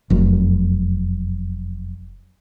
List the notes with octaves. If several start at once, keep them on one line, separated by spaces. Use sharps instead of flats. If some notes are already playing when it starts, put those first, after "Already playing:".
F1 F#2